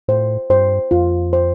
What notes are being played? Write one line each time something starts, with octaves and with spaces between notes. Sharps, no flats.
A2 C5
G2 C5
F2 F4
C5